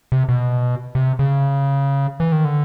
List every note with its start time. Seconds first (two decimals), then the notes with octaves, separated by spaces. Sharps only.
0.12 C3
0.29 B2
0.95 C3
1.19 C#3
2.20 E3
2.32 D#3
2.45 D3